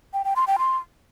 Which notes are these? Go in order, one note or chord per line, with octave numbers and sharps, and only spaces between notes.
G5
G5
C6
G5
C6